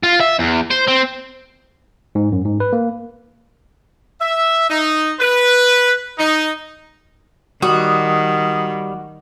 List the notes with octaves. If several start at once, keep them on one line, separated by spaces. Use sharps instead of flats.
F4
E5
E2
C5
C4
G#2
F#2
G#2
B4
A#3
E5
D#4
B4
D#4
D#3 G3 F#4 D#6